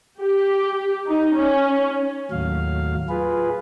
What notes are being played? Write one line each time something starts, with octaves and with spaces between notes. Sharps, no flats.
G4
D#4
C#4
D#2 A2 F#3 F5
F4 G#4 B4